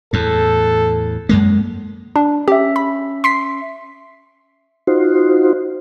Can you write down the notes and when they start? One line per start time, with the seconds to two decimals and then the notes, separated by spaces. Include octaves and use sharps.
0.13 E2 A2 A4
1.29 F#2 G#3 A#3
2.16 D4
2.48 C#4 G4 E5
2.76 B5
3.24 C6 B6 C7
4.87 D#4 F4 F#4 C5